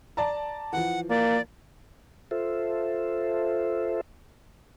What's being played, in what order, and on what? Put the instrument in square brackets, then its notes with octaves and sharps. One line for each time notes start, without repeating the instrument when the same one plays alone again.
[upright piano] D5 A5 A#5
[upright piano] E3 F3 [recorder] F#5
[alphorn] A#3 [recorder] D5
[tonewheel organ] F4 A4 C5 E5